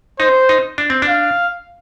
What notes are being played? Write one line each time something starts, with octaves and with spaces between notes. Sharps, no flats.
D#4 C5
D#4
D4
C4
D4
F5